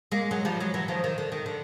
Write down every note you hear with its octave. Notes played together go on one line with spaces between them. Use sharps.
G#3 A#3
F#3 G#3
F3 G3
F#3 G#3
E3 F#3
D#3 F3
D#3
D3
D#3
D3